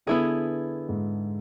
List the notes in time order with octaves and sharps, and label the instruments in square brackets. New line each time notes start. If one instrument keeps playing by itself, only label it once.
[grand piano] D3 [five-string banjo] B3 E4 G#4
[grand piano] G#2